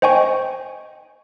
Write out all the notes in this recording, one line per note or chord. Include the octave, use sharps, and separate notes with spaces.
C5 D#5 G5 G#5 C#6